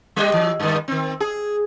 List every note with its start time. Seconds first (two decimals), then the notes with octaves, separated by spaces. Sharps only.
0.16 G3 G4 D#5
0.34 E3
0.60 G2 D#3
0.88 D#3 C4
1.20 G#4